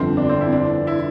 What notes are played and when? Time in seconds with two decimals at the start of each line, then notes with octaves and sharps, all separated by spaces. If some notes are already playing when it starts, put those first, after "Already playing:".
Already playing: G1 F2 D3 C4
0.17 D4
0.29 C4
0.41 E4
0.53 D4
0.87 E4